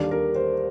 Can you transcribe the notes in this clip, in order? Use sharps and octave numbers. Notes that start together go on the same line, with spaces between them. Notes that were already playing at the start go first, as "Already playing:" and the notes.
Already playing: D#2 D3 G3 D4 D5
A#4
C5